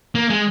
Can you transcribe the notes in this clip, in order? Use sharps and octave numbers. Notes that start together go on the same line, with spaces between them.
A#3
G#3